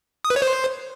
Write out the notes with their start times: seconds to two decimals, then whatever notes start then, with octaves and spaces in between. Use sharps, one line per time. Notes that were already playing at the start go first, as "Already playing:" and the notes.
0.25 D#6
0.30 B4
0.36 C#5
0.42 C5